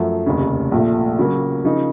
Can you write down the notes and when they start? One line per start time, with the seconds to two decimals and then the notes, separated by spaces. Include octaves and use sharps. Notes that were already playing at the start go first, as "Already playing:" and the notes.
Already playing: F#2 F3 A3
0.26 F1 D#2 C#3
0.71 A#1 A#2 A3
1.19 C#3 F#3 A#3
1.65 C#3 F3 A#3 D#4